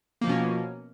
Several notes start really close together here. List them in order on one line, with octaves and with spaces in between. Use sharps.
A#3 F3 B2 C#4